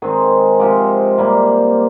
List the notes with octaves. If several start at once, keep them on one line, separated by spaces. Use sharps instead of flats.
D#3 G#3 C4 G#4
C3 F3 G#3 G4
C3 G3 A#3